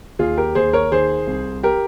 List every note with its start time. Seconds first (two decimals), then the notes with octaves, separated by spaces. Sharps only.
0.19 D#2 F4 G#4
0.37 G4 A#4
0.55 D#2 G#4 C5
0.73 A#4 C#5
0.92 D#3 G#4 C5
1.27 C2
1.63 G4 A#4